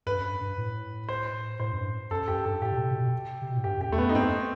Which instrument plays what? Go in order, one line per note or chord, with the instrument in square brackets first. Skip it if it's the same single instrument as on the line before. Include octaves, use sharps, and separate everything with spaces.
[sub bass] G2 [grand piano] B4
[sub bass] F#2
G2
G2
A2
[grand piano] C5
[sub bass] A2 [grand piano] C5
[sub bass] F#2
G2
[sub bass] F#2 [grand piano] A4
[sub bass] F#2 [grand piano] G4
[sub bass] G2 [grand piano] A4
[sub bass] A2 [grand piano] G4
[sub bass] B2
C3
C3
B2
C3
B2
A2
[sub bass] G2 [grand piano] G4
[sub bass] F#2
[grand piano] G4
[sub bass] E2 [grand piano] A3
[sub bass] F#2 [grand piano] B3
[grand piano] D#4
[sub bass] G2 [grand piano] C4